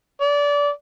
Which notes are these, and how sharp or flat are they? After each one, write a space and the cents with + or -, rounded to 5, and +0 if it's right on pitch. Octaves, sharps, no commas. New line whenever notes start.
D5 -25